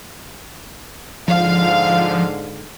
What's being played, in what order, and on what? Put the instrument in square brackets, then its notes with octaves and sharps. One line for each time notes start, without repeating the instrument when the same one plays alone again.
[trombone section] G#2 D3 [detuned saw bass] F3 [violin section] F5